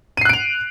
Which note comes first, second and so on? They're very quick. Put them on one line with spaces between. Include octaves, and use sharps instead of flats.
D#7 C7 F#6 D7 F7